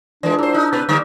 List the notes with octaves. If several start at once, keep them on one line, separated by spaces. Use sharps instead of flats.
E3 G#3 D4 F4 A#4 D5
G#2 E4 C5 A#5 E6
D#4 E6 F#6 G6
B2 B4
D3 G3 A#3